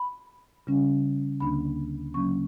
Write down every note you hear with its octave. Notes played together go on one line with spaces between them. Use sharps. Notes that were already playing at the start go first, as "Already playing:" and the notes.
Already playing: B5
C#3 G3 C#4
D2 D3 A#3 D4 B5
C#3 F#3 A#3 C#4 C#6